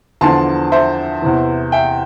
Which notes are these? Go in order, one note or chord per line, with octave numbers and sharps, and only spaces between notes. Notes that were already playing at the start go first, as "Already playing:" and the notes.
E2 D3 F3 A5 C6
C5 E5
E2 C3 E3
E5 G5